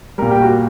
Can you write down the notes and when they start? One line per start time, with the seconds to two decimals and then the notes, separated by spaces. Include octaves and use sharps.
0.18 A#2 G3 A#4
0.31 G4
0.42 F#4